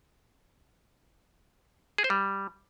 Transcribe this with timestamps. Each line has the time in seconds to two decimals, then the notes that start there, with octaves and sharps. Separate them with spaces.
1.98 G#4
2.04 C5
2.10 G3